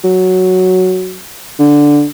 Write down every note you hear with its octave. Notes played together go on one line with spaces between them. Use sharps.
F#3
D3